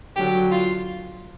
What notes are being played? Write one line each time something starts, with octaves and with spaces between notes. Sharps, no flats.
D3 F#3 G4
F4